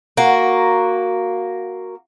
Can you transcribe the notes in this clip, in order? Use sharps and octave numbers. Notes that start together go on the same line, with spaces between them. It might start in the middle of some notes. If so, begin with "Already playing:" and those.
A#3 F#4